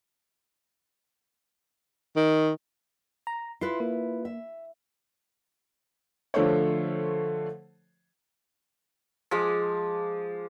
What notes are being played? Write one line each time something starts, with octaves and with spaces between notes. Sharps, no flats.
D#3
A#5
E4 F4 B4 C6
A#3
E5
D3 F3 A3 A4 C5 C#5
F3 G#3 D6